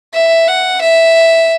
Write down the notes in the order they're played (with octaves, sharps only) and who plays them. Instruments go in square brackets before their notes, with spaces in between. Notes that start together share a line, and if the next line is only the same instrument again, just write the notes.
[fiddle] E5
F#5
E5